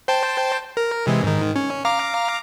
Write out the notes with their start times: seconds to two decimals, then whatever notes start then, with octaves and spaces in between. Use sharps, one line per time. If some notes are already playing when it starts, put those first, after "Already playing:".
0.08 C5 G5 A5
0.77 A#4
1.07 C3 E3 G#3
1.23 G#2 D#3
1.56 C#4
1.85 F5 A#5 D6